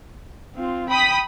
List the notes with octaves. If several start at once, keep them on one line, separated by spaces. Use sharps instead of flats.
C4 F4
G5 B5 D#6 B6